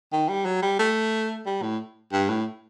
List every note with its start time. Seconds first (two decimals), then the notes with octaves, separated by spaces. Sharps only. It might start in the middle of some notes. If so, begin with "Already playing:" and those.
0.12 D#3
0.29 G3
0.45 F#3
0.62 G3
0.79 A3
1.46 G3
1.62 A2
2.12 G2
2.29 A2